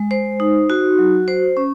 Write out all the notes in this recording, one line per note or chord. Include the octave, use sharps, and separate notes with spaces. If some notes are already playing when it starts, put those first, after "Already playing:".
Already playing: G#3
C5
D#4
F#4
F#3
C5
C#4